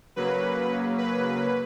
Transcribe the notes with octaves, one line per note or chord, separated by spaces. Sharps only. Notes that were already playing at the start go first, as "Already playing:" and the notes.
C#3 F#3 A#3 B4
B4